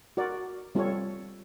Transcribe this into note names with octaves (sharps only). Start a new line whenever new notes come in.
F#4 A#4 D5
G3 C4 F4 A4 C#5